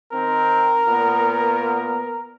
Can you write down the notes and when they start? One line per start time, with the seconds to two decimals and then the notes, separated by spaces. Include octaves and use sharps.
0.12 D#3 C4 A#4
0.87 A#2 B3